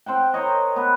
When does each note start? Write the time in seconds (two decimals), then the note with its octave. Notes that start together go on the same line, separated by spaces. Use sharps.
0.06 C4 C5 F#5 G5
0.34 A#4 C5 C#5 D#5
0.76 B3 B4